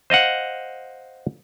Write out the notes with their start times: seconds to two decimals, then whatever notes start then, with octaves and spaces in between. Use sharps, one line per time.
0.10 C5 D#5 F5 F#5